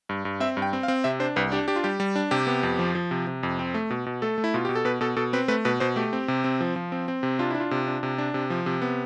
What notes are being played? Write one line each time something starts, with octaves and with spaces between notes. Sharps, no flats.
G2
G2
C4 E5
G2
G5
C4
F5
C4
C3 E5
D4 C5
C2 B4
D4 G4
D4 G4
F4
G3 G4
G3
D4
C3 G4
B3
F2
F3
F3
C3
C3
F2
C4
A3
B2
B2
A3 A4
A3
E4
B2 F4
B2 G4
A4
B2 B4
B2 A4
B2 A4
C4 B4
A3 B4
B2 B4
B2 C5
A3 G4
C4
C3
C4
F3
F3
C4
C4
C3
D4 F4
D4 E4
F4
C3
D4
C3
D4
C3
F3
C3
B3